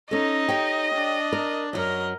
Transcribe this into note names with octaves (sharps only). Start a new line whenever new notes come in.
C#4 D#4 A4 D#5 A#6
G4 C#5 G5
D4
A#4
F#2 F#3 A#4 D#5